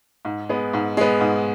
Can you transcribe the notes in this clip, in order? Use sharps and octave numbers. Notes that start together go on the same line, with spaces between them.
G#2
G#3 B3
G#2
G#3 B3
G#2